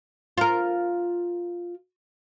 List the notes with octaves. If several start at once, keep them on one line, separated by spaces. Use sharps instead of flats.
F4 A#4